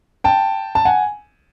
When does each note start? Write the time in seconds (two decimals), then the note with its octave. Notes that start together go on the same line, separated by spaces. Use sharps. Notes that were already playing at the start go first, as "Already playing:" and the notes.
0.24 G5 A5
0.75 A5
0.85 F#5 G#5